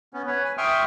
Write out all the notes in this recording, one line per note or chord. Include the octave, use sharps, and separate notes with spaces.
B3 C#4
B4 C#5
G#5
E5 G5 C6 C#6 D#6 F6